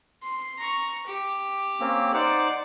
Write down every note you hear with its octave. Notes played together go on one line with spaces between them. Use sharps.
C6
A#5 C#6
G4
A#3 C4 C#4
D#4 C5 D5 F#5